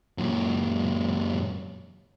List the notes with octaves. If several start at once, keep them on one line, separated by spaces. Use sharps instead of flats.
F#2 A#2